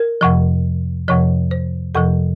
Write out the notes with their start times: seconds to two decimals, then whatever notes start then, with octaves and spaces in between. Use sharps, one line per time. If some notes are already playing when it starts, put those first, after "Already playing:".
Already playing: A#4
0.21 F2 C3 F3
1.08 F2 C3 F3 C#5
1.51 C5
1.95 F2 C3 F3 A4